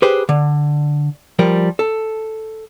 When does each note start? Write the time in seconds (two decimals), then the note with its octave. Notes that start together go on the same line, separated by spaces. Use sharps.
0.02 G4 G#4 B4 C5
0.29 D3
1.39 F3 G3 A#4
1.79 A4